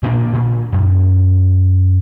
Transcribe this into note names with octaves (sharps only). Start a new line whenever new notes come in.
A#2 A#3 C4 D4
A#2
F#2